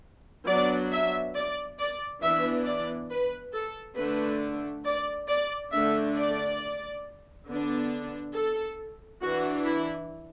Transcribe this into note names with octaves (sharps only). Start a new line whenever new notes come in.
F#3 B3 D4 D5
E5
D5
D5
E3 B3 D4 E5
D5
B4
A4
D3 A3 D4 B4
D5
D5
D3 A3 D4 E5
D5
D3 B3 D4
A4
E3 D4 F#4
E4